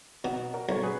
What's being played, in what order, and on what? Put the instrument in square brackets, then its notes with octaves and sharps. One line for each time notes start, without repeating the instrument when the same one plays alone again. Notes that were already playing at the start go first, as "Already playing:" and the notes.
[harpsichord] B2 [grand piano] D#4 F#4
[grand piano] F#4 A#4
[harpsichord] B1 [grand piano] C#5
[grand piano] G#4 B4